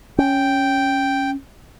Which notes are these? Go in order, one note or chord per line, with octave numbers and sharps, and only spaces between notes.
C#4 G5